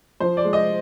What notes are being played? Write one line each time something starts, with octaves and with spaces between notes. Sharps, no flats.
F3 C5
D5
G#3
D#5